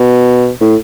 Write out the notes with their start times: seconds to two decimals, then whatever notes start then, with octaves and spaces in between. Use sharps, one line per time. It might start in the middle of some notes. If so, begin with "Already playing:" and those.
Already playing: B2
0.61 A2